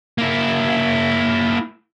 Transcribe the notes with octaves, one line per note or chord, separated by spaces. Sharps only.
A#3 E4